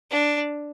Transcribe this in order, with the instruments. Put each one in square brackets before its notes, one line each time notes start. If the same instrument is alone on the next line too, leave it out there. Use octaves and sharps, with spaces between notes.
[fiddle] D4